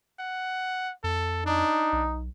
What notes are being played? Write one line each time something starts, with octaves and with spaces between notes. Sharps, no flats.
F#5
F2 A4
D4 D#4
B1